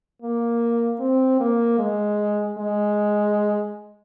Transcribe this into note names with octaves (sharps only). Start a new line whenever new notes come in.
A#3
C4
A#3
G#3
G#3